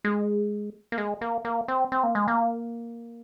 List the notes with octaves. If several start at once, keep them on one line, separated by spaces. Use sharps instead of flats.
G#3
A#3
G#3
A#3
A#3
C4
C4
A#3
G#3
A#3